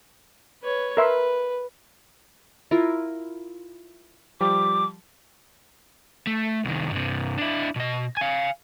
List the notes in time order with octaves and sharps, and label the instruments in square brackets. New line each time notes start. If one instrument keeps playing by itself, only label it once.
[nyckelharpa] B4 C#5
[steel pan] A#4 E5 C6 [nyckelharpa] B4
[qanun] E4 F4 A#4
[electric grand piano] F3 G3 G4 [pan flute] D6
[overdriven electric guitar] A3
C2 D#3
G2 C3
D4 E4
B2 D#5
F5 G#5